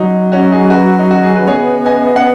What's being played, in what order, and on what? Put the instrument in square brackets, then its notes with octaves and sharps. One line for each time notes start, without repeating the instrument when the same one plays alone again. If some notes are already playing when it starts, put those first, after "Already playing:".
Already playing: [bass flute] F#3 [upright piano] D#4
[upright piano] C#4 F#4
D#4 G#4
F#4 B4
D#4
F#4
G#4
B4
[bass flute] B3 [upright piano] G#4 C#5
[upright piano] D#5 G#5
D#5
F#5